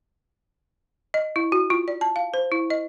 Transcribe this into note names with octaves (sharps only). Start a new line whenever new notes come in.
D#5
E4
F#4
F4
D5
A5
F5
C5
E4
D#5